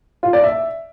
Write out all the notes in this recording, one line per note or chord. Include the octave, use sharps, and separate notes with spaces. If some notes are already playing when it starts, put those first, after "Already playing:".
F4
D5
E5